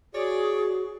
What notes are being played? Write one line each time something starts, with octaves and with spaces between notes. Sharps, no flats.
F#4 G#4 C#5 D5